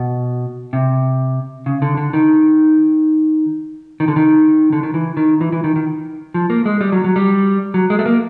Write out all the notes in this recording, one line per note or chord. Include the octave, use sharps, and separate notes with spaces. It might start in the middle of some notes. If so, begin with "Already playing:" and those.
Already playing: B2
C3
C#3
D3
D3
D#3
D#3
D3
D#3
D3
D#3
E3
D#3
E3
E3
D#3
D#3
F3
A#3
G#3
G3
F#3
F#3
G3
F#3
G#3
A3
A#3